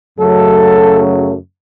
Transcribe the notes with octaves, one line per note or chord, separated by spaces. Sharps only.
F#2 C#3 F#3 A3 A4